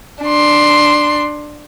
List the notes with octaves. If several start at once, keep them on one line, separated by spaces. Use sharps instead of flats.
D4 C6